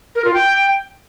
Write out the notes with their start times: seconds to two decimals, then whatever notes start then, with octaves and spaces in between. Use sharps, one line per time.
0.15 A#4
0.25 F4
0.34 G5